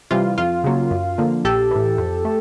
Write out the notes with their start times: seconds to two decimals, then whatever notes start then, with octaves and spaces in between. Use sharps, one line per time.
0.11 C3 E3 G3 F4
0.38 F2 F4
0.64 C#3 F#3 A#3
0.91 F#2
1.18 D3 F3 A#3
1.45 A#1 G4 A4
1.71 A2 E3
1.98 F2
2.25 A3